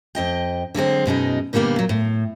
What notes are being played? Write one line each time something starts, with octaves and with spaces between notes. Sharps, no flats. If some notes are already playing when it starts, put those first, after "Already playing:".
F2 D#5 G5
D3 F#3 G#3 C4
F#2 B2 G#3 D#4
A#2 D3 G3 A#3 B3
A#2 F#3
A2